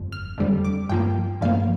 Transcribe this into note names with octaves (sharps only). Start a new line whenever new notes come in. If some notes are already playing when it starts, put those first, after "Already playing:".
Already playing: G1 F2
F6
F2 D3 G3
D6
G2 F3 A#3 G5
G2 F3 A#3 F5